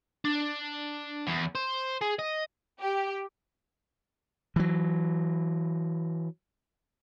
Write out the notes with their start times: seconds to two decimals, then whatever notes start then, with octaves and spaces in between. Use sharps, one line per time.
0.25 D4
1.27 E2
1.55 C5
2.01 G#4
2.19 D#5
2.81 G4
4.56 E3 F#3